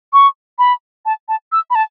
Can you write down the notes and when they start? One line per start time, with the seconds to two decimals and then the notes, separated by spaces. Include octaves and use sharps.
0.13 C#6
0.59 B5
1.06 A5
1.29 A5
1.52 E6
1.70 B5
1.75 A5